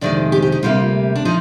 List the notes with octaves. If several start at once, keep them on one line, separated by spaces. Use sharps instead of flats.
F2 C3 D#3 G#3 D5
G4
G4
D#4
D2 C3 G3 A#3 F4
D4
F3 D#4